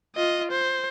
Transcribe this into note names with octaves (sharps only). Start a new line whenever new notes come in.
F4 D#5
C5